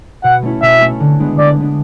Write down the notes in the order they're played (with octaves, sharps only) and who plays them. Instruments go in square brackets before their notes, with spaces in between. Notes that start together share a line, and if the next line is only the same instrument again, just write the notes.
[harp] B2 [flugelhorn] F#5
[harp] A3 C#4 E4
[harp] B2 [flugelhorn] E5
[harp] A3 C#4 E4
D3
G#3 B3 D4
[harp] D3 [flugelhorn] D5
[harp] G#3 B3 D4